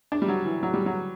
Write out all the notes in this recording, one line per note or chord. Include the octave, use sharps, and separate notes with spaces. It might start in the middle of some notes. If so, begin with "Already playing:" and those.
D4
G3
F#3
E3
F#3
G3
F#3